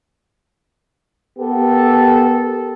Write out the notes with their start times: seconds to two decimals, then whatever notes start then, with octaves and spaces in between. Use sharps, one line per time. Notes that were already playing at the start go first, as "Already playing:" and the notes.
1.39 B3 G4 A4 A#4